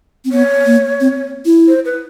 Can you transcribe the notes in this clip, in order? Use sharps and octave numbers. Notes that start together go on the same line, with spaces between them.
C4
B3 C#5
A#3
C4
E4
C5
B4